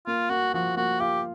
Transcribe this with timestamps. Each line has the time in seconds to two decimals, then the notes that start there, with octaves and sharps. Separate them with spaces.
0.07 A#3 F4
0.30 A#3 F#4
0.54 F3 F#4
0.76 A#3 F#4
1.00 F4 G4